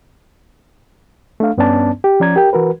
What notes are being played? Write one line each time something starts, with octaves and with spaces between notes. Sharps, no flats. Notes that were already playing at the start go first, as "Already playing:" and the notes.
A3 D4 F5
G2 B3 C#4 D4 D5 A5
G4
F3 C#4 D5 A#5 G#6
G4 A#4 G5
E3 F#4 A#4 B4